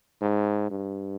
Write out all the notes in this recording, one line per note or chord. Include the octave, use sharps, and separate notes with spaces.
G#2
G2